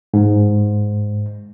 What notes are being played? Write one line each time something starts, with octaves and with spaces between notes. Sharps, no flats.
G#2